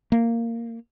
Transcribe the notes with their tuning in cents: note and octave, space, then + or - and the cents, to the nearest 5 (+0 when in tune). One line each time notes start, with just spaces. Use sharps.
A#3 -10